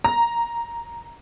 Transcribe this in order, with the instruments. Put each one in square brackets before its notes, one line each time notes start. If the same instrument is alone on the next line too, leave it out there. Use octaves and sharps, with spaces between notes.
[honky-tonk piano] A#5